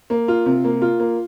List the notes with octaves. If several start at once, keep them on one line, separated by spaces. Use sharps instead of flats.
A#3
F4
C3
A#3
F4
A#3